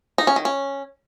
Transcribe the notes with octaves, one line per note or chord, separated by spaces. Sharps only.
D#4
C#4
D#3
C#4